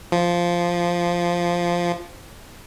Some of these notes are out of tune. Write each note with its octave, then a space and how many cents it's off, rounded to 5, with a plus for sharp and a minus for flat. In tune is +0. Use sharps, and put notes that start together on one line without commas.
F3 -5